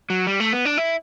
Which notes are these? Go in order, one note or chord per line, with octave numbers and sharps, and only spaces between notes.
F#3
G3
A3
B3
D4
E4